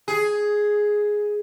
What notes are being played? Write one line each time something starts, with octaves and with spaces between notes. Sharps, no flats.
G#4